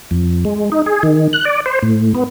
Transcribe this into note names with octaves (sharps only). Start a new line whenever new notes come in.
F2
G#3
D#4
G#4
D#3
F#6
D5
C5
A2
B3